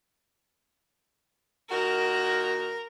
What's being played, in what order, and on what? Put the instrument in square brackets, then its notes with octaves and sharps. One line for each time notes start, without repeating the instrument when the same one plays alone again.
[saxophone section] A#2 D#3 F#4 [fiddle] A#4